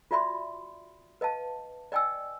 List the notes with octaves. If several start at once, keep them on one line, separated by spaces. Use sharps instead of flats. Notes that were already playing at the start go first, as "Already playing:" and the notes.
F4 F#4 D5 E5 B5 C6
B4 D#5 F5 A5
D5 D#5 G5 G#5 E6